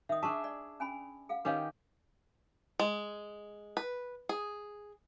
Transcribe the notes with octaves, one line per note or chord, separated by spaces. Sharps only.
D#3 E5 D#6
D4 G#4 E5 A5 C#6
D5
C#4 G#5 B5
G#4 F5 F#5
D#3 C#4 G4 B4 C#5 F5
G#3
B4
G#4